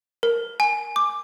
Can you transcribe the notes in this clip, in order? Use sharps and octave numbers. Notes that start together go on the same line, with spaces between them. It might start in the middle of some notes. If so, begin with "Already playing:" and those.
A#4
G#5
D6